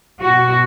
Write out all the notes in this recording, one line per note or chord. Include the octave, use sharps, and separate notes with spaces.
B2 F#4